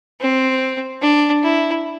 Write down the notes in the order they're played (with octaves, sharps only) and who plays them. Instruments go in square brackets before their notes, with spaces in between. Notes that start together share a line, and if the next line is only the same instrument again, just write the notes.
[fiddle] C4
D4
E4